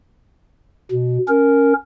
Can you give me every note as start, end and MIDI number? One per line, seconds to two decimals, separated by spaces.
0.92 1.18 47
1.28 1.73 61
1.28 1.73 70